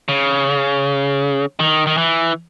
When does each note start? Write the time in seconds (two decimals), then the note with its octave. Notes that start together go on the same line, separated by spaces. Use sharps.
0.09 C#3
1.60 D#3
1.87 D#3
1.98 E3